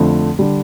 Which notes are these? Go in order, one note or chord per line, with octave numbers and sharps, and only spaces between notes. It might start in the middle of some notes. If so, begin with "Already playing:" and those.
Already playing: F2 D3 F3 A3
D3 G3